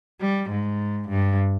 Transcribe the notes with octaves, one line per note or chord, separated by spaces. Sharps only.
G3
G#2
G2